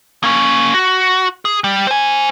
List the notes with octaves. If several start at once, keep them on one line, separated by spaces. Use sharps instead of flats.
A#3 C#4
F#4
G#4
G3
C5 G#5